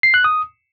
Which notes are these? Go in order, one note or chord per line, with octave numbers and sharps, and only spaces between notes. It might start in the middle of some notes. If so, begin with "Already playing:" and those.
C7
F#6
D#6